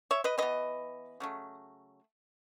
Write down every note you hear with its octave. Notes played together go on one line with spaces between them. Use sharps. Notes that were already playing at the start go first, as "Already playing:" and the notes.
C#5 E5
B4 D#5
E3 B3 B4 D#5
C#3 F#3 A3